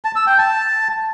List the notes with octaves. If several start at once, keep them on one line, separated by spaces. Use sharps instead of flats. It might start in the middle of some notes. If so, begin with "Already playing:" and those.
A5
E6
G5
A5